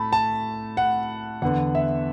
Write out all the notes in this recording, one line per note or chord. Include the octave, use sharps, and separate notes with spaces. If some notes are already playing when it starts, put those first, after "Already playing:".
Already playing: A2 A3 A5 B5
A5
F#5
E2 D3 B3 F#5
E5